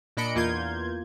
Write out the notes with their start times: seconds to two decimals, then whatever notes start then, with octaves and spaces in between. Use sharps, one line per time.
0.17 A#2 D4 D#5 B5 C#7 D7
0.35 E2 A#3 F4 G6 G#6